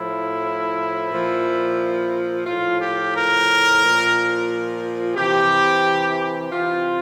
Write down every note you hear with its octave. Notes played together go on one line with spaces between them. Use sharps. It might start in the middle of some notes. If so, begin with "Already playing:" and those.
Already playing: A2 F3 E4
A#2 F3
A2 F3 F4
G4
A#4
A#2 F3
C3 E3 G4
C3 E3 F4